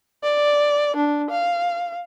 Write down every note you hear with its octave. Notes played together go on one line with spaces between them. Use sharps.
D5
D4
F5